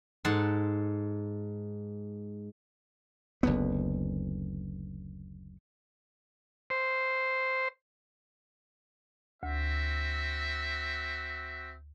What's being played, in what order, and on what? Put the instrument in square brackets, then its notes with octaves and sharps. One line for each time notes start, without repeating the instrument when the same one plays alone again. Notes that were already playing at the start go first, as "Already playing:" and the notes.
[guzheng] G#2 A4 F#5 A5 C6
[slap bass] F#1 D2 B3
[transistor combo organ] C5
[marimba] D2 [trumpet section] C4 F#4 E5